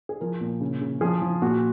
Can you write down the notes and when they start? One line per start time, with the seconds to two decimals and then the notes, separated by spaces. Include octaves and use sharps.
0.09 G#4
0.21 F3 A#4
0.41 A#2
0.61 C#3
0.81 C#3
1.01 F3 G#4
1.22 F3
1.42 A#2 F#4